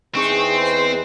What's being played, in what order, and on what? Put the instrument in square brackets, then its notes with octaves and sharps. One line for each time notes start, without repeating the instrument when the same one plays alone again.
[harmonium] E2 E3 B4 [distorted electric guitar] C4 [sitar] D#4 G#4 [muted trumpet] C#6
[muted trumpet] C5